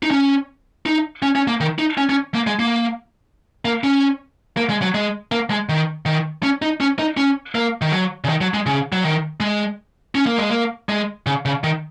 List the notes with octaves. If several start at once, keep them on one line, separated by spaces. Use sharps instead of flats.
D#4
C#4
D#4
C#4
C#4
A#3
D#3
D#4
C#4
C#4
A#3
G#3
A#3
A#3
C#4
A#3
G#3
F#3
G#3
A#3
G#3
D#3
D#3
C#4
D#4
C#4
D#4
C#4
A#3
D#3
F#3
C#3
D#3
F#3
G#3
C#3
F#3
D#3
G#3
C#4
A#3
G#3
A#3
G#3
C#3
C#3
D#3